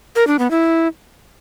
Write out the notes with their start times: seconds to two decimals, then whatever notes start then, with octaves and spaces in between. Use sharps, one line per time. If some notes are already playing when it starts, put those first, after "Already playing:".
0.16 A#4
0.27 D4
0.39 B3
0.51 E4